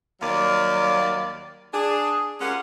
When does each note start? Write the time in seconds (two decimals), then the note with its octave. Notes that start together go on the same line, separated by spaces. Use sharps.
0.21 D#2 F#3 G3 D5 F5
1.73 D4 G#4
2.41 G#3 C#4 F4 G4 A#4 F#5